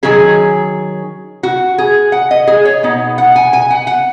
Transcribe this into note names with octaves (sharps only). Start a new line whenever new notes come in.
D#3 F#3 C#4 G#4
F#4
G#4
F#5
D#5
G#4
C#5
B2 B3 D#4
F#5
G#5
G#5
F#5
F#5